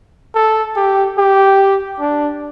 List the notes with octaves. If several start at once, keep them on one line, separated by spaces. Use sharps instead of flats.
A4
G4
G4
D4